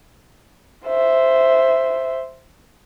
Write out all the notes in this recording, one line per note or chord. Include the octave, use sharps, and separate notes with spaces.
C5 E5